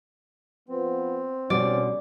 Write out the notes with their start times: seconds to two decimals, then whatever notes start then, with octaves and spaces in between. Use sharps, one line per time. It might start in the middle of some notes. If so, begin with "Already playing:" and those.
0.69 F3 B3 C4
1.50 C2 B2 D3 G3 C#4 D5